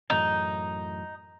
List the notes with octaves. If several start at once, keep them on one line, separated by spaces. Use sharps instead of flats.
F#2 A2 E3 D#4